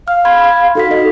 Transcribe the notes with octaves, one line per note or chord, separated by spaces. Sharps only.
F5 F6
B5 C6 G#6
D#4 F#4 A4 B6
D#4 D#5